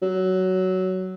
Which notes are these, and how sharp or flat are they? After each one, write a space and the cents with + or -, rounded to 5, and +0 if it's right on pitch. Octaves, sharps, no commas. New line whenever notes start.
F#3 +15